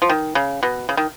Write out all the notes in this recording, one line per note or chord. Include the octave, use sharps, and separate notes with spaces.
F3
D#3
C#3
B2
C#3
D#3